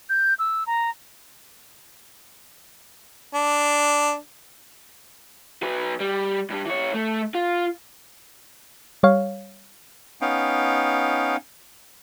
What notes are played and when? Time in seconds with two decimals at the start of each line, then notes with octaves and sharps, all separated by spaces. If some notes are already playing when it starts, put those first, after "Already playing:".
0.09 G6
0.39 E6
0.67 A#5
3.34 D4
5.63 F#3 B4
6.01 G3
6.50 G2 G3
6.66 E3 C#5
6.94 A3
7.35 F4
9.03 G3 C#5 F5
10.21 B3 C#4 D#4 F5 G5